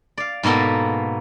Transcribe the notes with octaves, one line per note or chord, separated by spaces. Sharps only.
D5 F5
G#2 B2 A#3 B3 A4